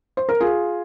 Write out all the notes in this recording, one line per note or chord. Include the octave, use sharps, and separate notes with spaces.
C5
A#4
F4 G#4